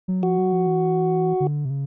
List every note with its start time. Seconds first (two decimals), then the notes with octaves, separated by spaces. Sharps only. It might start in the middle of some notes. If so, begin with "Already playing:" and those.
0.08 F#3
0.23 F3 F#4
0.38 F#3
0.52 F3
0.67 E3
1.40 D3
1.65 C3
1.70 C#3